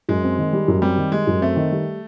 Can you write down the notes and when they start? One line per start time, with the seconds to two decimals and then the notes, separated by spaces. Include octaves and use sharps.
0.09 F#2 G#3
0.23 C4
0.39 D#3
0.53 G3
0.68 F#2
0.82 G3 C4
0.97 D#3
1.12 G3 G#3
1.27 F#2
1.42 A3 C4
1.56 D#3
1.72 G3